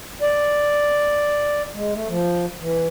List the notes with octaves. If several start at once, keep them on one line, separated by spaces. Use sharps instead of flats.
D5
G#3
A3
F3
E3